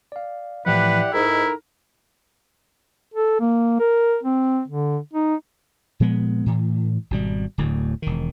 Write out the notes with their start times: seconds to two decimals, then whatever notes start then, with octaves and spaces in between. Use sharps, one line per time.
0.12 D5 F5
0.66 A2 E3 F3 E4 G4 B4 D5 F#5
1.13 G#2 D#4 E4 A4 A#4
3.14 A4
3.40 A#3
3.80 A#4
4.23 C4
4.68 D3
5.14 D#4
6.00 A#2 F3 G#3 B3
6.46 A2 E3
7.11 G#1 B2 G3
7.58 D1 D2 A2
8.02 E1 D#3